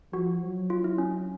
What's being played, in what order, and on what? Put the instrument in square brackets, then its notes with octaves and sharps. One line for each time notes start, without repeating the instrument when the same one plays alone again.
[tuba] F3 [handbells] F#4
[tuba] F#3
[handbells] F4
E4
C#4